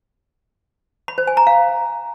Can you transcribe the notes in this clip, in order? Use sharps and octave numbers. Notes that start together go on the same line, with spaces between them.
B5
C5
G#5
A#5
F5